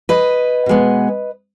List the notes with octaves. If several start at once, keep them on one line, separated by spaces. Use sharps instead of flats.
B4 D#5
B2 G#3 B3